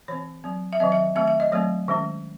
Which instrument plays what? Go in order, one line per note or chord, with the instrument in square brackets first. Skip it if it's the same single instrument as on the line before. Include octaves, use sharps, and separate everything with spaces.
[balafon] E3 C4 C#5
F#3 C4
E5
D#3 F#3 C4 D#5
E5
D#3 A3 C4 E5
E5
D#5
F#3 A3 C4 C#5
D#3 G#3 C#4